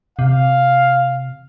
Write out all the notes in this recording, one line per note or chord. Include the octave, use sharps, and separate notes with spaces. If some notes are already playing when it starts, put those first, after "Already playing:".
C3 F5